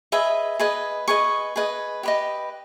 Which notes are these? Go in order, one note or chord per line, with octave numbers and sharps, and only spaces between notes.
G#4 B4 D#5 E5
G#4 B4 D#5
G#4 B4 D#5 C#6
G#4 B4 D#5
G4 B4 D#5